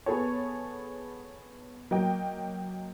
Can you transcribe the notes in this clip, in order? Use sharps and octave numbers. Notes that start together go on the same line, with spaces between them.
B3 G#4 A4 C#5
F#3 A#3 D#5 G5